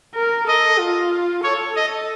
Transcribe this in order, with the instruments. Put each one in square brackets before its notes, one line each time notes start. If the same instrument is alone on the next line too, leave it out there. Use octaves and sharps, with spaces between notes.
[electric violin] A#4
[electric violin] A4 [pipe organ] D#5
[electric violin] F4
[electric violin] A4 [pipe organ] C#5
[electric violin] A4 [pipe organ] D#5